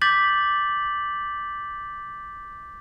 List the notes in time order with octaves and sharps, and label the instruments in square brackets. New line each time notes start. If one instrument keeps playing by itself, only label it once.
[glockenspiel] D6 G6 A6 B6 F#7